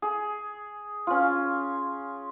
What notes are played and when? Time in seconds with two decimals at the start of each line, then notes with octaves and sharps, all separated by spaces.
0.02 G#4
1.07 C#4 F4